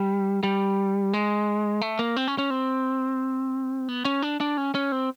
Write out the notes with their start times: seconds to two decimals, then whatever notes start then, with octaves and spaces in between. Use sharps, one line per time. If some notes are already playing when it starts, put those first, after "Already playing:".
Already playing: G3
0.43 G3
1.13 G#3
1.81 A3
1.99 A#3
2.16 C4
2.28 C#4
2.38 C#4
2.50 C4
3.89 B3
4.05 C#4
4.22 D4
4.40 D4
4.57 C#4
4.75 C#4
4.92 C4